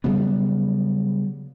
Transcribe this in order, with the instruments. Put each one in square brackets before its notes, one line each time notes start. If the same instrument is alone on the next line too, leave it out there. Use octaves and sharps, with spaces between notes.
[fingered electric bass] C#3 F#3 G3 B3